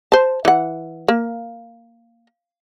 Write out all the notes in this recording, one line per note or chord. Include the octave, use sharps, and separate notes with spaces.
C5 A5
E3 F#5
A#3